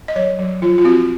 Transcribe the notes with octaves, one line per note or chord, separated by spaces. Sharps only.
D#5
F#3 C#5
F#3
F3 F4
F4
C4 F#4